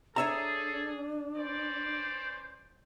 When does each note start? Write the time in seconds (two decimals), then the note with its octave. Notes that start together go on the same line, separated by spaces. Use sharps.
0.16 D4 G#4 A4 C#5 E5 A#5
1.35 E3 C#4 C5 D5